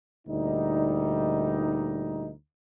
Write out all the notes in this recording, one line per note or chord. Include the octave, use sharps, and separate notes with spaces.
D2 A#2 G3 D#4